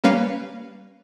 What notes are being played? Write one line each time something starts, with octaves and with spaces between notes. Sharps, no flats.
G3 A#3 C#4 B4 C#5 F5